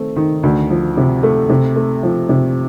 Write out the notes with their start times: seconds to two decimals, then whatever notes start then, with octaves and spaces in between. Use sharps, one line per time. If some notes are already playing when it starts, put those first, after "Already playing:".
Already playing: D#3 A3 C4
0.16 D#3
0.43 D2
0.70 F3
0.97 C3
1.23 A3
1.49 C3
1.76 A3
2.03 F3
2.29 C3